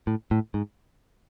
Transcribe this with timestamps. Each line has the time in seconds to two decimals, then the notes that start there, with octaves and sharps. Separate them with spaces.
0.07 A2
0.31 A2
0.54 G#2